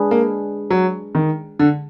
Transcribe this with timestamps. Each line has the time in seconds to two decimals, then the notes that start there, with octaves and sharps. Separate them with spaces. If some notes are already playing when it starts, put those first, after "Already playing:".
Already playing: G#3 D4 G#4 B4
0.11 A#3
0.70 F#3
1.15 D#3
1.59 D3